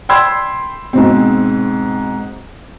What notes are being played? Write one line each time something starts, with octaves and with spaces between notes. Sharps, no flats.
G5 B5 C6 E6 G#6
G#2 B2 C4